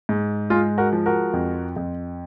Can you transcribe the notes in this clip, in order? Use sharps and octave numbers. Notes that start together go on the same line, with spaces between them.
G#2
G#3 F4 G#4
F#4 A#4
F3
F#4 A#4
F2
F2